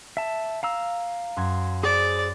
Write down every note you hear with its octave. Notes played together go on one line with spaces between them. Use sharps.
E5 A5
F5 A#5 E6
F#2 C6 G#6
G#4 C5 D5